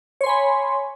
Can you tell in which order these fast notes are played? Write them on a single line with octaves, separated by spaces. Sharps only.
C#5 C6 G#5 B5